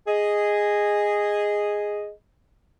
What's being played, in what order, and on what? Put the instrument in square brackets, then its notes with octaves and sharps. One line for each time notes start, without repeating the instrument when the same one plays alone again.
[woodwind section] G#4 D#5